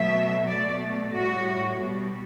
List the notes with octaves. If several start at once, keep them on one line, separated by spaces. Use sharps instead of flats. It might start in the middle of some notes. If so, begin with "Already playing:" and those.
Already playing: B2 F#3 A3 E5
B2 A3 D5
A2 G3 F#4
B2 G3